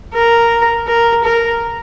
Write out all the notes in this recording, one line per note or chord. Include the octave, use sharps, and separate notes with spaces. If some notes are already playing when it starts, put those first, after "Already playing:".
A#4
A#4
A#4